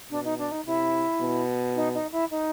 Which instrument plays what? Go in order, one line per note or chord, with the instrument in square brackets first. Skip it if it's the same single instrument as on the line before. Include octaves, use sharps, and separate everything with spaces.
[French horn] B2 [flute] D4
[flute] D#4
D4
D#4
[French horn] C3 [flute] E4
[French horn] B2
[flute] D#4
D#4
E4
D#4